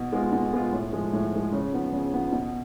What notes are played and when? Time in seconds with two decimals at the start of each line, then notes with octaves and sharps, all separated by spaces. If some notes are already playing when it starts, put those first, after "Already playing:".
Already playing: B2
0.12 G#3 B3 F4
0.32 B2
0.53 G#3 B3 F4
0.72 A2
0.93 F3 G#3
1.13 A2
1.32 F3 G#3
1.52 C#3
1.72 F3 B3
1.92 C#3
2.13 F3 B3
2.32 B2